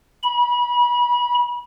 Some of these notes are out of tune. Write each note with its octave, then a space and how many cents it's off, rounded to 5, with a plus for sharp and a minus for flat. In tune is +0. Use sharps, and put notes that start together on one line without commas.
B5 -30